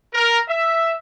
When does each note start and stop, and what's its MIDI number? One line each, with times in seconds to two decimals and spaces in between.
0.14 0.39 70
0.49 0.94 76